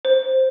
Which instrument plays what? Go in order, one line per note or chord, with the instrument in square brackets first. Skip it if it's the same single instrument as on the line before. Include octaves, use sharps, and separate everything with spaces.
[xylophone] C5